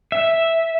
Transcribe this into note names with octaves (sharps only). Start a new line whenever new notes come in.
E5